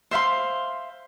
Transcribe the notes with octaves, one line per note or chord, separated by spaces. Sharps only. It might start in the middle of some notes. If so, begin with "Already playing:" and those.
C5 E5 F5 C6